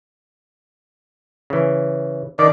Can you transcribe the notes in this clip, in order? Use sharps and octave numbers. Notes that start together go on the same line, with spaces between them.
C#3 E3
D#3 D4 D5